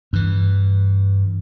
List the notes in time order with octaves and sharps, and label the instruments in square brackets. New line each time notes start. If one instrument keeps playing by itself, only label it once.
[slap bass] G2 E3